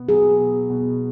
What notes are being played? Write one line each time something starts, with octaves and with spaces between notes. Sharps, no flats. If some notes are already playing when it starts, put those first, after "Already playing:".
Already playing: B2 B3
F#3 G#4
B2
B2